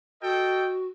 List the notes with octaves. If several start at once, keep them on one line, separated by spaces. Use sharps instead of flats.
F#4 A4 D#5 G5